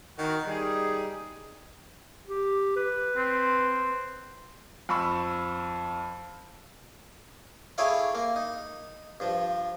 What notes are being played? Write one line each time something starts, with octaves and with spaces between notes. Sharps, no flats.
D#3 F#4
G3 D#4 G#4
G4
B4
C4
F2 B5 C#6 E6
E4 G#4 A4 C#5 D5 F5
A#3
D#4
G2 F3